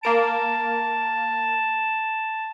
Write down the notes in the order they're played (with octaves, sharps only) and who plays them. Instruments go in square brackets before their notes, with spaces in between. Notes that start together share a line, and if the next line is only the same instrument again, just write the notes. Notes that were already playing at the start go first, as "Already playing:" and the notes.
[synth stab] A#3 A#4 D7 [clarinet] A5